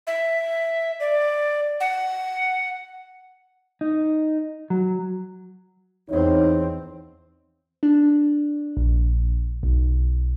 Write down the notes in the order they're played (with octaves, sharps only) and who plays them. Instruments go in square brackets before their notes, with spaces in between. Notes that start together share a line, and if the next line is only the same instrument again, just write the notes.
[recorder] E5
D5
F#5
[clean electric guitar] D#4
F#3
[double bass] E2 C4 [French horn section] D#4 C#5
[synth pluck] D4
A#1
B1